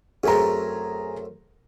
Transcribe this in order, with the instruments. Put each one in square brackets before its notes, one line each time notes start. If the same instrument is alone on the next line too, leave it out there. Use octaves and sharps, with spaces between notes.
[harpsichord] F#2 A3 C4 [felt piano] G#4 A#5